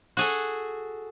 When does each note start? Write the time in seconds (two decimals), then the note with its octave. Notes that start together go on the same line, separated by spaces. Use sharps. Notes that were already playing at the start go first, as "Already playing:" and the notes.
0.17 F#4 G#4 A4